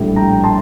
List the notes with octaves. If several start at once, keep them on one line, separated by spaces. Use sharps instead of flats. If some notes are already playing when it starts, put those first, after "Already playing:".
Already playing: A#1 A2 G3
G5 A#5
A5 C6